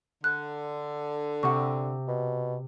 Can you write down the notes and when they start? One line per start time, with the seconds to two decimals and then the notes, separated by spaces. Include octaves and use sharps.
0.24 D3 F#6
1.43 C3 F#5 C#6
2.08 B2